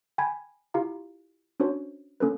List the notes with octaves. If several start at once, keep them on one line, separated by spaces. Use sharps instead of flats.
G5 G#5 B5 G#6
E4 F4 G4 F5 A#5
C#4 D4 F#4 C5 C#5
A#3 C#4 A4 B4